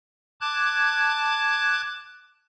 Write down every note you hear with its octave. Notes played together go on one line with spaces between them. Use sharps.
A5 D6 F#6 G#6